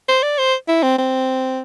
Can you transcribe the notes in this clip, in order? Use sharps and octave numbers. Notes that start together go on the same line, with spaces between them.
C5
D5
C5
E4
C4
C4